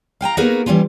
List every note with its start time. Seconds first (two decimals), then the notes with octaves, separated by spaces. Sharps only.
0.21 F5 G5 G#5 A#5
0.37 A#3 B3 D#4 F#4 G#4 A#4
0.66 E3 G3 A#3 C#4 F4